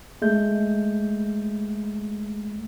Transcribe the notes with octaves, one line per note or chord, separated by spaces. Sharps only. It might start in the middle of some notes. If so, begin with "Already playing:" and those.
G#3 A3 G6